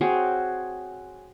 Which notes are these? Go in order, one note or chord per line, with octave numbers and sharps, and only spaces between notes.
C4 F#4 G#4 C#5